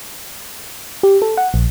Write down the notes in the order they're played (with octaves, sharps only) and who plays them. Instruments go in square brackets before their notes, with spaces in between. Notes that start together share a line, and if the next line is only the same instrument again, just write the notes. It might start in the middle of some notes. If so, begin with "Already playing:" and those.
[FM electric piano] G4
A4
F#5
A#1